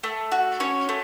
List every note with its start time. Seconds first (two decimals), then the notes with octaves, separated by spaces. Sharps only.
0.03 A3
0.32 F#4
0.60 C#4 C#5
0.89 A3